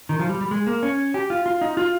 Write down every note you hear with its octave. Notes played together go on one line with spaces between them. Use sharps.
D#3
F3
G3
G3
G#3
A#3
C#4
G4
F4
F4
D#4
F4